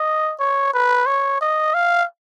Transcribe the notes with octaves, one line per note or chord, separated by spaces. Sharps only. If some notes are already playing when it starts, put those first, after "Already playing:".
Already playing: D#5
C#5
B4
C#5
D#5
F5